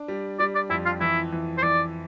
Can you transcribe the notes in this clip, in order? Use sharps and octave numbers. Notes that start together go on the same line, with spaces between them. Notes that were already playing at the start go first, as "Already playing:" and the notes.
Already playing: D4
G3
G3 D5
D5
F2 E4
F4
E3 E4
E3
C5
E3 D5